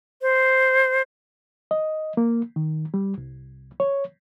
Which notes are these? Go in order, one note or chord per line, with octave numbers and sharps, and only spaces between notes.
C5
D#5
A#3
D#3
G3
C2
C#5